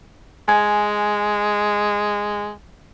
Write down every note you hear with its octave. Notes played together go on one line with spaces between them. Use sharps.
G#3 G#5 G#6